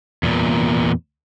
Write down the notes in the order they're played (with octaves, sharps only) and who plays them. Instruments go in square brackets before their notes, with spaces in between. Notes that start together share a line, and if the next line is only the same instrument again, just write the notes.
[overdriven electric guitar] E2 A#2